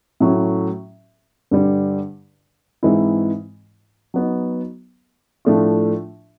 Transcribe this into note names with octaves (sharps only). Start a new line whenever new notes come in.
A2 F#3 A3 C#4
G2 D3 G3
G#2 E3 G#3 C4 E4
F#3 B3 D#4
A2 F3 A3 D4 F4